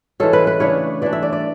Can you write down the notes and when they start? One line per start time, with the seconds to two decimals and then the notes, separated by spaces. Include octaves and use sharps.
0.20 E3 G#3 C#4 A4
0.33 B4
0.47 B4
0.60 C#3 E3 A3 D4 C#5
1.02 E3 A3 D4 D5
1.13 E5
1.23 D5
1.33 D5